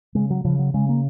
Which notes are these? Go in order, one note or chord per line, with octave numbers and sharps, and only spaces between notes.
C#3 G#3
F#3
C#3 F3
F#3
C#3 G#3
A#3